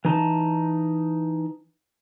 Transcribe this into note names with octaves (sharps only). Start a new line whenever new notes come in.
E3 D#4 A5